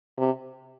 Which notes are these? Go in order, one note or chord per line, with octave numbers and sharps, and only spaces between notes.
C3